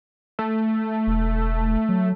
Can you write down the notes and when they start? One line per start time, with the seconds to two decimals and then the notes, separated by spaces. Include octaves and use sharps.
0.39 A3
1.07 E1
1.89 F#3